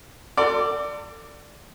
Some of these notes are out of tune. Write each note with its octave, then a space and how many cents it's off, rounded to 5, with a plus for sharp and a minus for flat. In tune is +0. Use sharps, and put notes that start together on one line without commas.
A4 +40 D5 +0